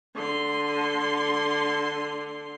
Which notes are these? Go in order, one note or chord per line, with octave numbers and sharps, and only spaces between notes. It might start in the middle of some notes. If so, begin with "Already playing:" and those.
D3 C6